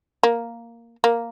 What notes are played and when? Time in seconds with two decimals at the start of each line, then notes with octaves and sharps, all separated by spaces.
0.23 A#3
1.04 A#3